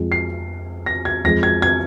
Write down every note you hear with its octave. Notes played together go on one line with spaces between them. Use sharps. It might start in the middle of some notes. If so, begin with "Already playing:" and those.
Already playing: F2 F3 G#3
C7
A#6
G#6
F2 F3 G#3 A#6
G#6
G#6